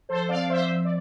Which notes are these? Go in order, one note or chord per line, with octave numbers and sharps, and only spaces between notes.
F3 A4 C5
C4 D5 F5
F3 C5 E5
F3
D5